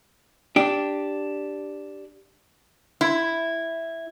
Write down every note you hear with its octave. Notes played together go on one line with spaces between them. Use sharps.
D4 G4
E4